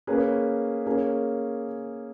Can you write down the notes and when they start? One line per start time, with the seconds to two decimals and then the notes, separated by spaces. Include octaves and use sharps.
0.07 A#3 C#4 G#4 B4
0.86 A#3 C#4 G#4